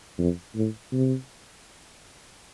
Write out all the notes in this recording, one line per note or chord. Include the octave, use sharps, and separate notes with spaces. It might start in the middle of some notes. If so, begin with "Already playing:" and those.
F2
A2
C3